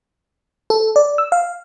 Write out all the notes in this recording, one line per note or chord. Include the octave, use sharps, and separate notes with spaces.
A4
D5
E6
F5